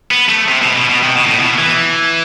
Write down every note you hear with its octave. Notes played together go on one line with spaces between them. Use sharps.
B3
A3
C3
B2
B2
B2
C3
B2
A2
B2
E3